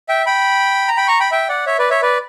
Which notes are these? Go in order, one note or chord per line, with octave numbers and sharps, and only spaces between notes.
E5 G5
G5 B5
A#5
G5 B5
A#5 C#6
G5 B5
E5 G5
D5 F#5
C#5 E5
B4 D5
C#5 E5
B4 D5